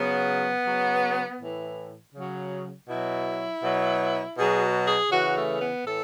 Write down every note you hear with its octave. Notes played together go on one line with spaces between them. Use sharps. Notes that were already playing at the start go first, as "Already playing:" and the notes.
Already playing: C#3 F#3 B3
C#3 F#3
A2 E3
C#3 F#3
B2 F#3 E4
B2 F#3
B2 F#3 G#4
G#4
C#3 E3 F#4
A3
B3
A2 E3 A4